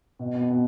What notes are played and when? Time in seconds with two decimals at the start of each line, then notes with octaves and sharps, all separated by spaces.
0.19 B2
0.35 B2
0.50 B2